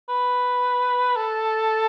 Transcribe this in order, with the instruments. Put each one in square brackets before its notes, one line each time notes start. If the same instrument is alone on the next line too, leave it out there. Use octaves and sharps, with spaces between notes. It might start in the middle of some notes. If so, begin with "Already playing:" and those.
[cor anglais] B4
A4